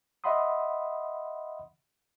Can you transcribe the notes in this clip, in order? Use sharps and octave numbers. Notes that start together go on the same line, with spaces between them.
D#5 E5 F#5 B5 C6 D#6